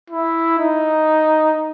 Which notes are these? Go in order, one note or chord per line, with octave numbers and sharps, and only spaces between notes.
E4
D#4